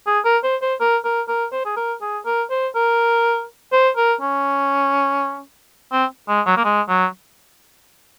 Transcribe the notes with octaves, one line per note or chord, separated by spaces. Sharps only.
G#4
A#4
C5
C5
A#4
A#4
A#4
C5
G#4
A#4
G#4
A#4
C5
A#4
C5
A#4
C#4
C4
G#3
F#3
A#3
G#3
F#3